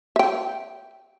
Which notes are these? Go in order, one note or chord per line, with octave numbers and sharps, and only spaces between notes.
E5 G5